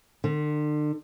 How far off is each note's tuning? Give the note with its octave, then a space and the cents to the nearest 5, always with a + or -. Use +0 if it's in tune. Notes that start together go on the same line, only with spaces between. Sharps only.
D3 +40